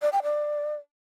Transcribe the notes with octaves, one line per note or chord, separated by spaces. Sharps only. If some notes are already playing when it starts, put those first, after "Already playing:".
D5
G5
D5